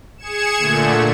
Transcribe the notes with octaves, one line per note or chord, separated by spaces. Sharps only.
G#4 G#6 C#7 E7
A#2 D3 A3